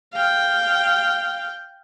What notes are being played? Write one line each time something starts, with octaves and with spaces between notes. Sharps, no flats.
F5 G5